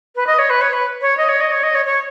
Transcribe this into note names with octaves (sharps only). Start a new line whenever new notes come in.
B4
D#5
C#5
B4
C#5
B4
C#5
D#5
C#5
D#5
C#5
D#5
C#5
C#5